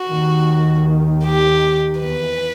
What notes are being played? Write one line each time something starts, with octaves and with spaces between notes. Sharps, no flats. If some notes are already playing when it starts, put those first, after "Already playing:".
Already playing: F#4
D#2 D#3
G4
E2 E3 B4